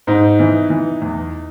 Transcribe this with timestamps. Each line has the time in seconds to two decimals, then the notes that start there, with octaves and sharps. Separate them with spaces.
0.07 G#2 D#4
0.40 E3
0.70 E3
1.02 E2